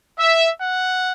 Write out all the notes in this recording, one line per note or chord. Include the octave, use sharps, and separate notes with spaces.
E5
F#5